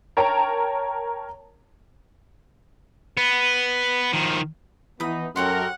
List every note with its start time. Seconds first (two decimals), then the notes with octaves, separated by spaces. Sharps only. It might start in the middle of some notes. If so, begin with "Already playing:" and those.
0.17 A#4 C#5 G5 A5 A#5
3.17 B3
4.13 D#3 F3
5.00 E3 B3 D#4 B5 D#6
5.36 F#2 G4 A4 A#4 C#5 F#5 C6